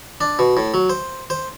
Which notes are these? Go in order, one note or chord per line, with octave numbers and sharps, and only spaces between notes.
D4
B2
A2
F#3
C5
C5